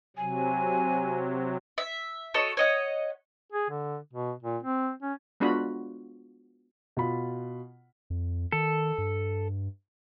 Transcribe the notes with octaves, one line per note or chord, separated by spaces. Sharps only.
C3 F#3 G#5
E5
F#4 A4 C#5 D#5
C#5 D#5 F#5
G#4
D3
B2
A#2
C4
C#4
G#3 B3 D4 F4 F#4 B5
B2 F4 B5
F2
D#3 A4
G2